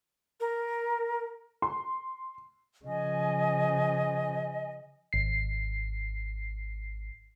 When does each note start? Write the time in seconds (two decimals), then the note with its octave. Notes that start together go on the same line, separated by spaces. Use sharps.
0.40 A#4
1.62 C6
2.85 C#3 F3 D#5 G#5
5.13 G#1 C7